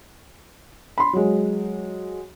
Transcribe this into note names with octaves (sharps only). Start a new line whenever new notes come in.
B5 C6
F#3 G#3